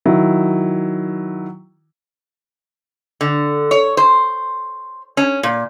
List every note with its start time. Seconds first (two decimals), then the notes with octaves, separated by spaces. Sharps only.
0.05 D#3 F#3 E4
3.21 D3
3.71 C#5
3.97 C5
5.17 C#4
5.43 A#2